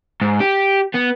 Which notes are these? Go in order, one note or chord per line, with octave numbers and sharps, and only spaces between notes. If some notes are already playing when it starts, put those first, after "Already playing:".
G#2
G4
B3